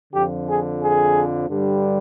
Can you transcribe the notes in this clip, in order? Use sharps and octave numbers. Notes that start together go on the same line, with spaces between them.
F2 D3 F3 G4
G#4
G#4
G2 D3 G3